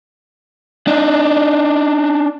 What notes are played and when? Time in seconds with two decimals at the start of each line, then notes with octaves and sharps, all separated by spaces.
0.87 D4 D#4